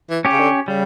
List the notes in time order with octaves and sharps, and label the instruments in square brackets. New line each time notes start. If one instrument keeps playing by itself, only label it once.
[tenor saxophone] E3
[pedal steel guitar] C#4 G4
[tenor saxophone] C#3
D3
[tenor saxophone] C#3 [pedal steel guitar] G3